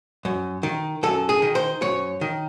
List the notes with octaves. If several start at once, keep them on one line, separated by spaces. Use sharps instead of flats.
F#2
D#3
F#2 A4
G#4
D#3
C5
F#2 C#5
D#3